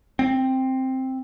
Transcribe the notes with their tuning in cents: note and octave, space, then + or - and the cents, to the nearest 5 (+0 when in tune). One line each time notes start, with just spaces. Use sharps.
C4 +5